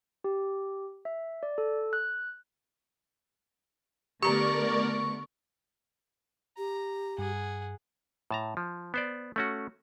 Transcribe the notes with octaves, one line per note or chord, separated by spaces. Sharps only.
G4
E5
D5
A4
F#6
D3 A3 B3 G4 A#4 D5 A#5 C#6
G4 A#5
G2 G#4 F#5
A2 A5 A#5
F3
B3 C5 D5
A3 C#4 F#4